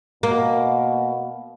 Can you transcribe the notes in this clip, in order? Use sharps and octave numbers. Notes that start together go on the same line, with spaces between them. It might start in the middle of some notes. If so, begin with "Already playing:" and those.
B2 A#3